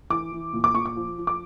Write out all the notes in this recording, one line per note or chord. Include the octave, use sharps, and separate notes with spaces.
E3 D6
E3
A#2
D6
A#2 C#6
D6
F3
F3
D6